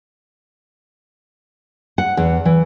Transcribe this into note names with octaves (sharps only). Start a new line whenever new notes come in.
F#5
E2
E3